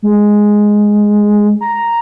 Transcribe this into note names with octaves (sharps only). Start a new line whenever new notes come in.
G#3
A#5